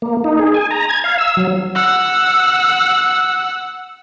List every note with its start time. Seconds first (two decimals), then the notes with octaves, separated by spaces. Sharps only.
0.02 A#3
0.24 D#4
0.39 G#4
0.54 G#5
0.71 A#5
0.89 G#6
1.04 F5
1.18 E6
1.37 F#3
1.75 F#5 E6